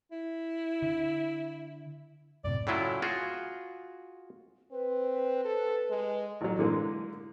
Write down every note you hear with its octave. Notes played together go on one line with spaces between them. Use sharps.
E4
D3
F#2 A2 C3 D5
A2 C#3 F#3 E4 F4
F4 F#4 G#4
C4 B4
A4
G#3
A1 F#3
D3 E3 G#3 A#3